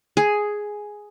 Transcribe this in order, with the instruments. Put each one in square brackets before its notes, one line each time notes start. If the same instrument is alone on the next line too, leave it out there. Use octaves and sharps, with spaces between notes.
[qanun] G#4